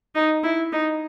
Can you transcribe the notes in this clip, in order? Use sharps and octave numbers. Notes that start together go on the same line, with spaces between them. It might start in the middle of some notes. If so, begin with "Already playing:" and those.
D#4
E4
D#4